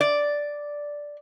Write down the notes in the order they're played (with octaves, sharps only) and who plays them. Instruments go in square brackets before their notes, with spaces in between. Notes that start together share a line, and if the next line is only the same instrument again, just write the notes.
[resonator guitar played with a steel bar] D5